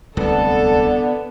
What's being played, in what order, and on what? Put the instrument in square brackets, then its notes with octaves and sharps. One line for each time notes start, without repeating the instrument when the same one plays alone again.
[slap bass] D1 C2 [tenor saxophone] D3 [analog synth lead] B3 [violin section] A4